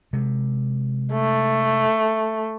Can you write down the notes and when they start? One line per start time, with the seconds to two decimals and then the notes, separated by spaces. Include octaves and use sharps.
0.13 C3 G#3
1.12 A3